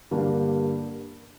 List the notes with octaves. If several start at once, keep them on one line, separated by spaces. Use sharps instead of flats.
G2 D3 G3 A#3 D4